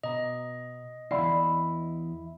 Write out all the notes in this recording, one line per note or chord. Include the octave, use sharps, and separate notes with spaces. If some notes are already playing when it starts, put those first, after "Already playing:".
B2 D#5 A#5
E2 D#3 E4 D5 F5